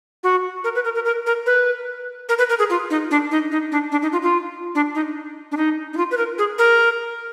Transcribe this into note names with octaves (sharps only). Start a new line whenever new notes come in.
F#4
A#4
B4
A#4
A#4
A#4
A#4
B4
A#4
B4
A#4
G#4
F4
D#4
D4
D#4
D#4
D4
D4
D#4
F4
F4
D4
D#4
D4
D#4
D#4
F4
B4
A#4
G#4
A#4